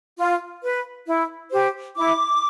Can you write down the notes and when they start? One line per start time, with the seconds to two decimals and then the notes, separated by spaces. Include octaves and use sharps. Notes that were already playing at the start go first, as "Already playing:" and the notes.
0.18 F4
0.62 B4
1.06 E4
1.52 G4 C5
1.96 E4 D6